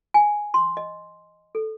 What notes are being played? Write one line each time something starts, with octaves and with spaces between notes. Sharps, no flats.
G#5
C6
D#5
A4